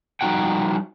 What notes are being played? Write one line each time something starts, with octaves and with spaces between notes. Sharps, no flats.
F3 G3 D#4 F#4 F#5 G5